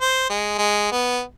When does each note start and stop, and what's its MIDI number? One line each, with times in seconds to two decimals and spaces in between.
0.01 0.25 72
0.30 0.58 56
0.58 0.88 56
0.91 1.21 59